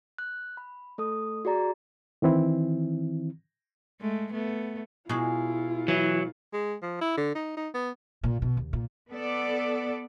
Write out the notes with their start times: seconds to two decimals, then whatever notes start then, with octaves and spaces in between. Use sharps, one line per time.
0.18 F#6
0.57 B5
0.98 A3 A4 D#6
1.45 F#4 G#4 D5 A#5 A6
2.22 D#3 E3 C4 E4
4.01 G#3 A3
4.32 A3 B3
5.09 B2 G#3 E4 F4
5.88 E3 F#3
6.53 G#3
6.82 F3
7.01 E4
7.17 D3
7.35 D#4
7.57 D#4
7.74 B3
8.23 A#2
8.42 B2
8.57 D#2
8.73 A#2
9.11 B3 A4 D5